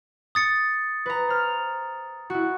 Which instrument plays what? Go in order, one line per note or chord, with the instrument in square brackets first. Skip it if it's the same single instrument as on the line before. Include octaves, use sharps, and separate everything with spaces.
[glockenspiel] D#6 A6 C#7
[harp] B4 A#5
C5 F6
E4 F#4